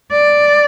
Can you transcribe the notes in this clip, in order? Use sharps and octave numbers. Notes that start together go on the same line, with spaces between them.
D5